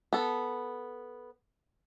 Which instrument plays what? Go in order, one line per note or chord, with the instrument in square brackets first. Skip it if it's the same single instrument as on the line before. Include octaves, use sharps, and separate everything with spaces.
[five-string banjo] B3 A4